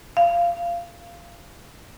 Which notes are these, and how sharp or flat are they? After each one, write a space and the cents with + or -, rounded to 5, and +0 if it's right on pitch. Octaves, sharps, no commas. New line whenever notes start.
F5 -20